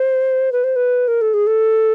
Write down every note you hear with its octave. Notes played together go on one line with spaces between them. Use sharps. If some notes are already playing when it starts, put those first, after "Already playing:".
Already playing: C5
B4
C5
B4
A#4
A4
G#4
A4